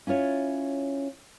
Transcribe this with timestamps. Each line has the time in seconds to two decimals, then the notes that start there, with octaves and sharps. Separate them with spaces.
0.07 C#4 E4 F4 C#5